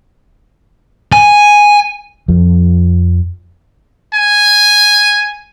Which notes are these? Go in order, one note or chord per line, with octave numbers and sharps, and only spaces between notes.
G#5
F2 F3
G#5